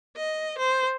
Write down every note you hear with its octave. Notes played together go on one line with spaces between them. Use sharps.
D#5
C5